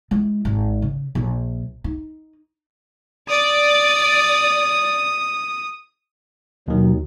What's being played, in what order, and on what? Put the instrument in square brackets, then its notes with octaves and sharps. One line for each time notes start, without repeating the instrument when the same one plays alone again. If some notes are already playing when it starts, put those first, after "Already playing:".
[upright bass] G#3 E4
G#1
C#3
A#1
D#4
[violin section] D5 [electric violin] D#6
[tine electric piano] D#2 D#3 [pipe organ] B2 F#3